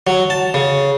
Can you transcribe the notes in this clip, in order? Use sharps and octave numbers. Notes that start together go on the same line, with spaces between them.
F#3
A5
C#3